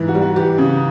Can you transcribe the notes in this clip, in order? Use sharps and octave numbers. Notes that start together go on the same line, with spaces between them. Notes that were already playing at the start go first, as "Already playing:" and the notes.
Already playing: G#2 E3
F#4
G3
F#4
E3 G4
C#3